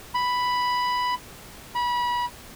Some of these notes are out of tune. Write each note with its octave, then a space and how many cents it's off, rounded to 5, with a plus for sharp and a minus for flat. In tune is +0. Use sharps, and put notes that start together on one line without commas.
B5 +0
B5 -30